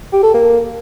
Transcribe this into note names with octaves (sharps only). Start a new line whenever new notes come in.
G4
A4
A#3